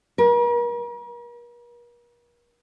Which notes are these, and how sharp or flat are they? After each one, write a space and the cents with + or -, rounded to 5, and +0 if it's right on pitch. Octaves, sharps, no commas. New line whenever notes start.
A#4 +45